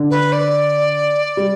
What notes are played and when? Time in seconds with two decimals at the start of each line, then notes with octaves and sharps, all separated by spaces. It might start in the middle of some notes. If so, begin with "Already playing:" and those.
Already playing: D3
0.10 B4
0.32 D5
1.37 G3